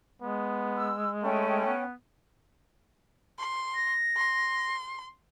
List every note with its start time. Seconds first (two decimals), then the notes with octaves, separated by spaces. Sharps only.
0.22 G#3 B3
0.76 E6
1.23 A3 C#4 G5
1.66 B3
3.38 C6
3.75 A#6
4.16 C6